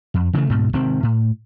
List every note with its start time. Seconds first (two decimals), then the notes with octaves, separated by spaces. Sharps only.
0.14 F2
0.33 C#3 E3 G#3 A3
0.49 D2 G#2 B2
0.73 G#1 C3 D#3 C4
1.03 A2